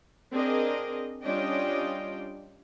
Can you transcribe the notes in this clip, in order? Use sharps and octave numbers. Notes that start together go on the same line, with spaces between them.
C4 D4 G#4 A#4 D#5
G3 C#4 D4 F4 D#5 G5